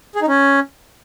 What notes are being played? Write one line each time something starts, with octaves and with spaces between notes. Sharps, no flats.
G#4
D#4
C#4